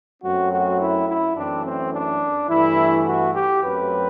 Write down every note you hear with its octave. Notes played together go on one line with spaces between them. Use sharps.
F#2 F#3 A3 C4 F#4
F#4
E4
E4
F#2 E3 A3 C4 D4
C4
D4
G2 E3 A3 E4
F#4
G4
F#2 F#3 A3 C4 B4